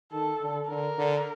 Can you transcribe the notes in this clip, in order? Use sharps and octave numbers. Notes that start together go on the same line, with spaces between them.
D#3 A4
D3
D3 A#4
D3